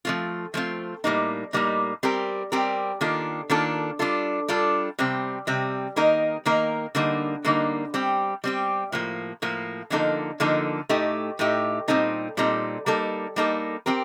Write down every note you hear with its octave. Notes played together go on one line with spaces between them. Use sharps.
F3 A3 C4 F4
F3 A3 C4 F4
A2 G3 A#3 D#4
A2 G3 A#3 D#4
G3 C4 G4 A#4
G3 C4 G4 A#4
D#3 A#3 D4 F4 A4
D#3 A#3 D4 F4 A4
G3 D4 F4 A4
G3 D4 F4 A4
C3 G3 C4
C3 G3 C4
D#3 A#3 D#4 A#4
D#3 A#3 D#4 A#4
D3 G3 A#3 D#4
D3 G3 A#3 D#4
G3 C4 G4
G3 C4 G4
A2 F3 A#3
A2 F3 A#3
D3 F3 A#3 D#4 A4
D3 F3 A#3 D#4 A4
A2 A3 D#4 G4
A2 A3 D#4 G4
A#2 G3 C4 D#4 A4
A#2 G3 C4 D#4 A4
G3 A#3 D#4 A4
G3 A#3 D#4 A4
F3 C4 G4 A#4